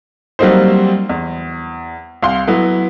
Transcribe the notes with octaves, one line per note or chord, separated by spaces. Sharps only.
F#3 G3 A#3 C4 D#4 C5
E2
C2 F5 C6
F#3 B3 E4